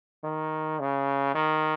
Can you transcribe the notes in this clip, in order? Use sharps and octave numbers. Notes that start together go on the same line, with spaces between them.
D#3
C#3
D#3